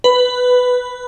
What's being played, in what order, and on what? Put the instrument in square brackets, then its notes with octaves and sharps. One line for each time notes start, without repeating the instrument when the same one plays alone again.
[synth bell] B4